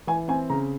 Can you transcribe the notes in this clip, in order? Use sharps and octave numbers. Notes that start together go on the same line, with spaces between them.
E3 G#5
C4 G#5
C#3 A#5